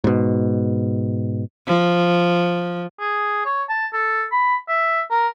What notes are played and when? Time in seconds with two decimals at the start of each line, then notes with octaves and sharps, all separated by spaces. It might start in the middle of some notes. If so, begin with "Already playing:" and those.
0.04 G#2 B2
1.67 F3
3.00 G#4
3.46 C#5
3.69 A5
3.93 A4
4.32 B5
4.69 E5
5.11 A#4